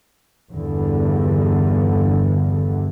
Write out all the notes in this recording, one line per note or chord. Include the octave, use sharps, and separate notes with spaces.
E2 G2 D3